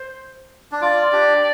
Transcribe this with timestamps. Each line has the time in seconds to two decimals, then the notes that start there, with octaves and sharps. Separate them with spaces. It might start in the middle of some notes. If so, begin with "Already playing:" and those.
Already playing: C5
0.72 D4
0.81 F4 D5
1.12 D4 G4